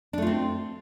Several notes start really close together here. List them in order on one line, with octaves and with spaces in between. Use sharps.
D4 A3 F4 C4